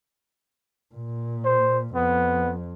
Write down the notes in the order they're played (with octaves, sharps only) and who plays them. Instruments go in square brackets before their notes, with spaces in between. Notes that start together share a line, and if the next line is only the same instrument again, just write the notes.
[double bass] A#2
[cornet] C5
[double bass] F2 [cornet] B3